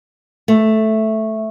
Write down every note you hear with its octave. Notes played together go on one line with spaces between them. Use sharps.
A3